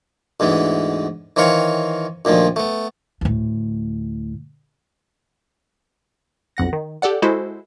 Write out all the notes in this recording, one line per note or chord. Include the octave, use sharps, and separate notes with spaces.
D2 G#2 E3 B3
D#3 E3 C4 C#5 F5 C#6
D2 A#2 D#3 F3
A3 B3
D2 A2
B1 F2 F#5 A#6
D#3
G4 A4 D5 F#5
G#3 E4 F#4 A4 C5